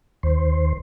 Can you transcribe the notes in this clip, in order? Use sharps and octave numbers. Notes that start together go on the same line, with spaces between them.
D#2 C5